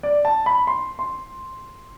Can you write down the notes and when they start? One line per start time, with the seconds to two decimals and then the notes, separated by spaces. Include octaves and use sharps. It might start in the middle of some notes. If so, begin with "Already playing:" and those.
0.03 D5
0.25 A5
0.46 B5
0.67 C6
0.99 C6